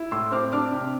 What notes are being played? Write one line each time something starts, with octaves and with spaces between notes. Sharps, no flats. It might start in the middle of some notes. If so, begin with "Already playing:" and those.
Already playing: E4
A2 C6 E6
C4 D6 F6
D4 D6 F6
C3